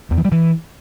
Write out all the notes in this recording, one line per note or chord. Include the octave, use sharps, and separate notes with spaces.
E2
E3
G3
E3